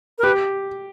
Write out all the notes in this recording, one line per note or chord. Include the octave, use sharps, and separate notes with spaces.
A#4
G4 B4